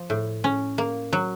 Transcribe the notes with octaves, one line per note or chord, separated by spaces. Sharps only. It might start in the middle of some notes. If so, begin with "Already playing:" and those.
Already playing: F3
A2
C#4
A#3
F#3